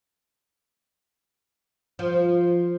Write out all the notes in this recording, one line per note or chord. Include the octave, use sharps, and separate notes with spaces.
F3